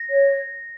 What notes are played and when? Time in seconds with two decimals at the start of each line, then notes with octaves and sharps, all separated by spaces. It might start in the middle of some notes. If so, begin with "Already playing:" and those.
Already playing: A#6
0.09 C#5